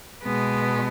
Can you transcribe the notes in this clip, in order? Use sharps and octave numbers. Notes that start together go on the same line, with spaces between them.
B2 G#3 B3